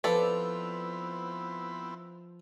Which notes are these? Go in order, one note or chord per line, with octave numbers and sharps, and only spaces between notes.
F3 B3 C4 E4 A4 B4 D5